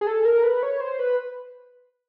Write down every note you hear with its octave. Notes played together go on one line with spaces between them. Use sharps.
G#4
A4
A#4
B4
C#5
C5
B4